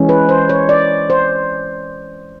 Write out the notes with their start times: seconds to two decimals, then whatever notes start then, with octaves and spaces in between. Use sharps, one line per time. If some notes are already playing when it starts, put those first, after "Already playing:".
Already playing: E3 G#3 C#4
0.09 B4
0.29 C5
0.49 C#5
0.69 D5
1.10 C5